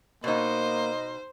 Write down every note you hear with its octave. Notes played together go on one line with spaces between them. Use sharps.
B2 A#3 D#4 C5 D#5